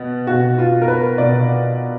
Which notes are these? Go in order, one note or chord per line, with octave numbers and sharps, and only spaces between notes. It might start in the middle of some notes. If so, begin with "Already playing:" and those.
Already playing: B2
B2 F#4
F4
A#4
B4
B2 D5